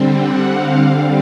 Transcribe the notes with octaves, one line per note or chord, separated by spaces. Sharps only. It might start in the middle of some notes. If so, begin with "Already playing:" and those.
Already playing: D3 G3 C4
F#5
F5